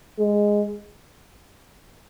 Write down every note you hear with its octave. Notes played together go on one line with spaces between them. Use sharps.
G#3